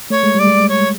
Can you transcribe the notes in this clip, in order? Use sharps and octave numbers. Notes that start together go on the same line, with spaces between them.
A3 C#5
G#3
G3 D5
G#3
C#5